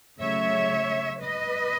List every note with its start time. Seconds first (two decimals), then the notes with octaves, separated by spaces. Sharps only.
0.20 C#3 F#3 A3 C#5 E5
1.22 B4 D#5